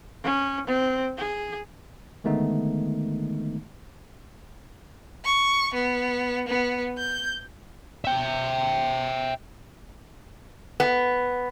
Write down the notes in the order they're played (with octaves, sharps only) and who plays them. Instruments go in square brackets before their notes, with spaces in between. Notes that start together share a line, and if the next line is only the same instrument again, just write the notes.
[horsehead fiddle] C#4
C4
G#4
[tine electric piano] D3 D#3 G#3 A3 B3 D#4
[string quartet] C#6
B3
B3
G6
[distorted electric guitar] E5 G5
[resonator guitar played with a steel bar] B3